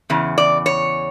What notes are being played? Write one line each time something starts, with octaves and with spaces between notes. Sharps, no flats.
E2 C#3
D5
C#5